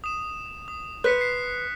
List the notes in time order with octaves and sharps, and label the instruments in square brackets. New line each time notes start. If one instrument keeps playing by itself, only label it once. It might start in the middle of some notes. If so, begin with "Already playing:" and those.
[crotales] D#6 E7
D#6
[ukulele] B4 C5 [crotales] F#6 B6 C#7
[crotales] C7